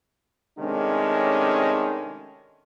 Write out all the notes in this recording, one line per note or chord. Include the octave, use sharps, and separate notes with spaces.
C3 D#3 G#3 A3 C#4 D4